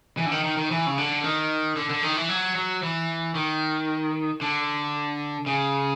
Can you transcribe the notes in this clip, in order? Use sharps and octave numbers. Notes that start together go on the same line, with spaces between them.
E3
D3
D#3
D#3
D#3
E3
C#3
D3
D#3
D3
D3
D#3
E3
F#3
F#3
E3
D#3
D3
C#3